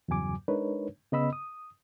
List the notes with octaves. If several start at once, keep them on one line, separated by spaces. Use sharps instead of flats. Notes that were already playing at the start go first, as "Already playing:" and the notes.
E2 G2 C#3 F#3 G#5 D6
G#3 D4 D#4 A#4 B4 C#5
C#3 B3 D#5 B5 E6
D#6